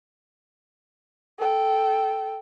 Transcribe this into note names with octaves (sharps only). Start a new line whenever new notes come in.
A4 G5